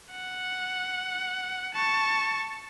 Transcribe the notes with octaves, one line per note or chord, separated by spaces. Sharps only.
F#5
A5 C#6